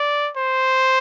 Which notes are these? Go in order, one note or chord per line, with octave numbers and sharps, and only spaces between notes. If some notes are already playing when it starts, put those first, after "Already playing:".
Already playing: D5
C5